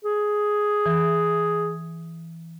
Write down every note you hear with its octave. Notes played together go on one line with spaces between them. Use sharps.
G#4
E3